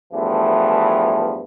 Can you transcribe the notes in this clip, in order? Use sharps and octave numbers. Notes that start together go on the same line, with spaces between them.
E2 G2 E3 F3 A3